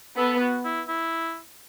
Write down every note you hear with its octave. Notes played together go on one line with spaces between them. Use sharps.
B3 A4
F#4
E4
E4